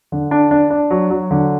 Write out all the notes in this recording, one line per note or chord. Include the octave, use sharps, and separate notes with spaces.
D3
D4
D4
D4
F#3
F#3
D3